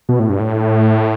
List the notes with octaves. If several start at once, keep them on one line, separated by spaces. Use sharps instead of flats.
B2
A2
G2
A2